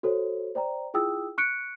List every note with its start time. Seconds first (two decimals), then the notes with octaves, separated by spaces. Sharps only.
0.03 F#4 A4 C5 C#5
0.55 C5 D5 G5 A#5
0.94 E4 F4 G#4 G5 D#6 E6
1.38 C#6 F#6 C#7 D7